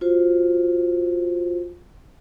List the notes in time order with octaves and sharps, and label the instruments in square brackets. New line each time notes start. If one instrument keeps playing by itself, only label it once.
[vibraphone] F4 F#4 C5